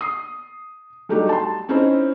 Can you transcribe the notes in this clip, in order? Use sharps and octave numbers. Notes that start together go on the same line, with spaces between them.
D#6 C7
F#3 G3 A3 D4 D#4 G4
A5 C6
C4 C#4 D#4 E4 C5